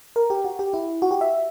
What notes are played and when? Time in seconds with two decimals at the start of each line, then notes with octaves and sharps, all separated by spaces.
0.16 A#4
0.30 G4
0.45 F#4
0.59 G4
0.73 E4
1.02 F#4
1.11 G4
1.21 E5